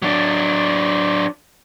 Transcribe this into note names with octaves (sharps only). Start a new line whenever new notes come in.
F#3 D4